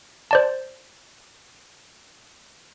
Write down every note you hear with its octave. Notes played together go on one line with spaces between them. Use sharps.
C5 D5 A5